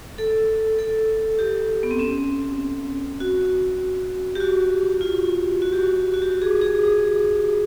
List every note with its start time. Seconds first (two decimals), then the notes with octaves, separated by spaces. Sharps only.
0.18 A4
0.79 A4
1.39 G4
1.83 B3
1.91 C4
1.99 C#4
3.20 F#4
4.35 G4
4.40 F#4
5.01 F4
5.62 F#4
5.73 G4
5.83 F#4
6.14 F#4
6.22 G4
6.42 G#4
6.61 G#4